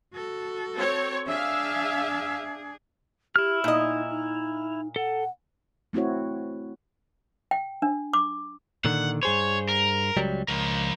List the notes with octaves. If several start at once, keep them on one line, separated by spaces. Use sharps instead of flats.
F#4 A4
C4 C#5
D4 G#4 E5 F5
E4 G4 F6
A#2 D#4 D#5
D#4
A4 F#5
A3 C4 E4 F#4 C#5
G5
D4
D6
A#2 D3 D#3 F#5
G2 G#4 C5 C#5
A#4
C#2 F#3 G3
C#2 F3 A#4